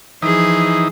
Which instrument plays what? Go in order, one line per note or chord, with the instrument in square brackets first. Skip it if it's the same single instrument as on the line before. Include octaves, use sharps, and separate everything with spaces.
[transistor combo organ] E3 D#4 [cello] F3 G#4